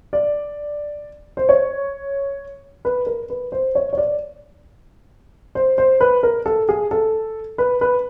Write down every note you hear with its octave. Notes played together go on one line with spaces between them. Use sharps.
D5
C5
C#5
B4
A#4
B4
C5
C#5
C#5
D5
C5
C5
B4
A#4
A4
G#4
A4
B4
B4